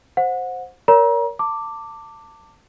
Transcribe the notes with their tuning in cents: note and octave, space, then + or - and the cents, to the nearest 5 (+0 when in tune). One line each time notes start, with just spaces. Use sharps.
C5 +5 F#5 -25
A#4 +5 C#5 +40 A#5 +35
A5 +30 D6 +0